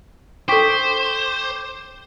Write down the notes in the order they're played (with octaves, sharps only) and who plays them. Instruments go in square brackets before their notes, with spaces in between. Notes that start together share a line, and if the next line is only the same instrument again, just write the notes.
[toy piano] D4 A4 [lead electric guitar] C5 [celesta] G5 C#6 B6 [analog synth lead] D6